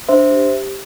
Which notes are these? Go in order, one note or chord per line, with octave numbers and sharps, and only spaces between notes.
D4 C5 E5
G4